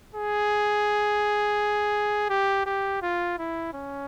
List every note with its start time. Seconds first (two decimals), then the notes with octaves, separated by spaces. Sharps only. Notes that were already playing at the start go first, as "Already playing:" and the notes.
0.15 G#4
2.30 G4
2.66 G4
3.03 F4
3.39 E4
3.74 C#4